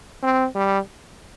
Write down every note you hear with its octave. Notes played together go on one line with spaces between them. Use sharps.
C4
G3